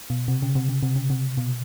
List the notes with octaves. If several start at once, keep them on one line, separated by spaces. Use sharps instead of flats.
B2
C3
C#3
C3
C#3
C3
C#3
C3
B2